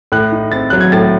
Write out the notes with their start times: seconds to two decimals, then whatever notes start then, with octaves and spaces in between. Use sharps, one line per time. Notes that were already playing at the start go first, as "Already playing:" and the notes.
0.12 A2 F#6
0.32 D#4
0.52 C4 A6
0.70 F#3 F#6
0.81 G#6
0.92 A2 A6